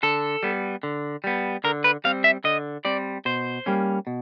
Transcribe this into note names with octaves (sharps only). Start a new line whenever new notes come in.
D3 A4
G3 B3
D3
G3 B3
D3 A#4
B4
G3 C4 F5
E5
D3 D#5
G3 C4 D5
B2 C5
G3 A#3 C#4
B2